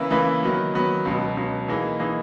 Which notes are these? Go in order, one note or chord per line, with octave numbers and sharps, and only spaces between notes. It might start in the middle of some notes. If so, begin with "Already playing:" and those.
Already playing: C#3 E3 A#3 E4 B4
C#3 E3 A#3 E4 B4
D#3 F#3 B3
D#3 F#3 B3
C#2 B2 F#3
C#2 B2 F#3
E3 A#3 D#4 G#4
E3 A#3 D#4 G#4